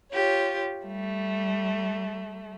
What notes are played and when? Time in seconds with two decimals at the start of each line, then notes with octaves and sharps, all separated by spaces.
0.11 F4 G4 C#5
0.84 G3 A3